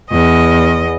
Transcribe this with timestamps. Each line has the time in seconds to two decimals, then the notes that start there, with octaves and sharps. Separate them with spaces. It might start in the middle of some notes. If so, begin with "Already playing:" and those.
0.11 E2 D#5